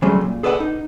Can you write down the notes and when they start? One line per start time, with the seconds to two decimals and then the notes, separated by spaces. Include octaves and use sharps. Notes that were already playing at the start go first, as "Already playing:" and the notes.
0.02 C#3 F#3 G3 A3 C4
0.21 A#2
0.43 G#4 A4 B4 D5 D#5 F#5
0.60 D#4